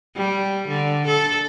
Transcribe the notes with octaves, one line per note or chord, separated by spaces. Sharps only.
G3
D3
A4